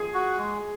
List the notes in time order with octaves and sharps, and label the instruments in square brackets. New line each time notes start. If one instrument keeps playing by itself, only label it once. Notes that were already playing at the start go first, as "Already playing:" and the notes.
Already playing: [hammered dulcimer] G#4
[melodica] F#4
G#3